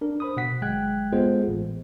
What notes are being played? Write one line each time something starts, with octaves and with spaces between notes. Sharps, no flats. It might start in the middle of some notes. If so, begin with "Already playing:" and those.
D4 A#4
C5 B5 D#6
B2 F#5 B6
G1 F#3 G#3 G5 F#6 G#6
G#3 B3 F4 G#4 A4 C5
A1